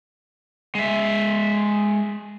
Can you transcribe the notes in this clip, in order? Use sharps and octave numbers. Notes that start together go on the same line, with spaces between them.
G#3 E5